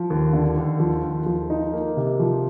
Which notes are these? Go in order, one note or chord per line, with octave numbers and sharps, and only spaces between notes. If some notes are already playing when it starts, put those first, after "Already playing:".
Already playing: F3
D#2
D3
D#2
F3
D#2
F3
D#4
A#3
C3
F3